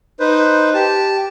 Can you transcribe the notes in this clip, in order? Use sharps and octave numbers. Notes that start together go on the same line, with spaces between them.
D#4 B4 C5
G4 A5